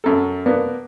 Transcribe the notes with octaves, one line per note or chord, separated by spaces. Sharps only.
F#2 A4
A#3 B3 D4